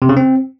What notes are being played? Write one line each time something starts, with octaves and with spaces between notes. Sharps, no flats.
C3
C#3
C4